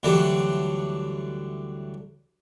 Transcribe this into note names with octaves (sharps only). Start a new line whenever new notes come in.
D2 D3 E3 F#3 G3